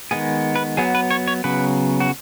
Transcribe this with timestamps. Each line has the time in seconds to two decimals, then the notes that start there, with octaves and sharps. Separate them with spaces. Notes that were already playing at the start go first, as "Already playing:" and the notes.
0.11 D#3 G#3 B3 G#4
0.56 B4
0.77 F#3 B3 G#4
0.95 B4
1.11 C#5
1.28 C#5
1.44 C#3 F#3 B3 B4
2.00 F#4